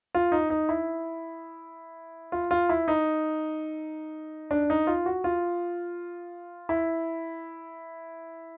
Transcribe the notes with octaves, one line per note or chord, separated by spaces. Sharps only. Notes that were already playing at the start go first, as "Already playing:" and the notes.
F4
D#4
D#4
E4
F4
F4
E4
D#4
D4
D#4
F4
F#4
F4
E4